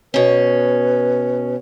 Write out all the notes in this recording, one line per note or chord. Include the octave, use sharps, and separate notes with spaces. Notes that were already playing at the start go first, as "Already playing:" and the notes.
B2 C#4 B4